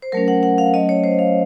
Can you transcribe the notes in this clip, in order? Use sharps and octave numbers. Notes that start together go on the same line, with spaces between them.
C5
F#3 A3 C#4 A#4
F#5
F#5
F5
F#3 A3 C#4 D#5
C#5
C5
F5